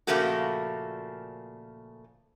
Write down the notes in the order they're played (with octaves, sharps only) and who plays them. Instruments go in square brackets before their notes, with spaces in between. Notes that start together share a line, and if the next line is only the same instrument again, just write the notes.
[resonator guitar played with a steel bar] A#2 C#3 F3 A3 A#3 F#4